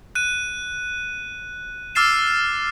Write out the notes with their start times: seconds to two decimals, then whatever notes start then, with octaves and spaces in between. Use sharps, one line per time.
0.15 F#6 D#7
1.95 D6 E6 F6 A6 C7 E7